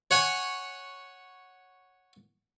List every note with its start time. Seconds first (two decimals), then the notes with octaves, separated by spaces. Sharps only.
0.11 C#5 F#5 G#5